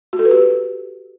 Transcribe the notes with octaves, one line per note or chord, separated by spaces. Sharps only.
F#4
A4
B4
G4